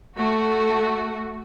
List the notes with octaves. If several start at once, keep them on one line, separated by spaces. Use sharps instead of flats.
A3 F#4